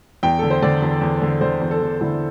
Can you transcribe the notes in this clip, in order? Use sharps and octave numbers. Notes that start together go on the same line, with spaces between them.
E2 G5
D3 A4
C5
D3 D5
E2
E2
D3
D3 C5
E2
A4
E2
D3 E4